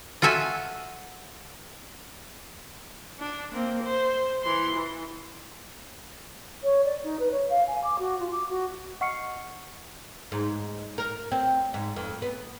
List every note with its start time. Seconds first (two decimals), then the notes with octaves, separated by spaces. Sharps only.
0.22 F4 F#4 A4 E5 G#5
3.20 D4
3.54 A#3 C4
3.83 C5
4.43 E3 C6
4.75 E3
6.63 C#5
6.85 D5
7.03 D#4
7.19 B4
7.31 C#5
7.49 F5
7.67 G#5
7.83 D6
7.98 F#4
8.19 F4
8.32 D6
8.49 F#4
9.01 D#5 F#5 C#6 F6 C7 C#7
10.32 G#2
10.98 A#4
11.32 C4
11.74 G#2
11.96 F2
12.22 B3